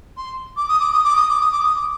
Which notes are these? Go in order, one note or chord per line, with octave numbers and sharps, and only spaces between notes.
C6
D6
D#6
D6
D#6
D6
D#6
D6
D#6
D6
D#6
D6